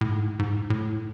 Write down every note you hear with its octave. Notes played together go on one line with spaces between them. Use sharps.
A2
G#2
G#2
A2